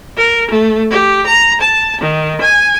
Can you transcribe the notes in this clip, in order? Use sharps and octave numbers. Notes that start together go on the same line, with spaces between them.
A#4
A3
G4
A#5
A5
D#3
G#5